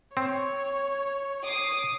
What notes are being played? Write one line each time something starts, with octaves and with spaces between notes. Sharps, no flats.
C4 C#5
D6 D#6 C7